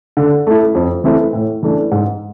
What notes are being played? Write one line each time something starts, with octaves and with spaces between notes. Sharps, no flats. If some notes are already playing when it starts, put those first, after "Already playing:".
D3
A3 E4
F2
E3 A3 C4 E4
A2
E3 A3 D4
G#2